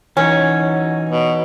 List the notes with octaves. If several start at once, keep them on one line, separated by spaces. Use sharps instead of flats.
E3 F#3 C#4 D#4
B2